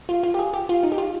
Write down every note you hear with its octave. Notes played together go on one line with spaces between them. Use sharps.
F4
F4
G4
G#4
G4
F4
D#4
G4
F4